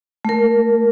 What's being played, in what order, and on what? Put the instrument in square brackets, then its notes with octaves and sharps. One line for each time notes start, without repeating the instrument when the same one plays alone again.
[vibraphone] A3 A#4